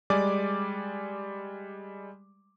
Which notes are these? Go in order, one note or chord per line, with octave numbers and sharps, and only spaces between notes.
G3 G#3 D5 G#5 D6